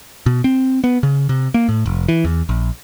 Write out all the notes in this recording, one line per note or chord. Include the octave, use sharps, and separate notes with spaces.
B2
C4
B3
C#3
C3
A#3
A2
F1
E3
E2
A#1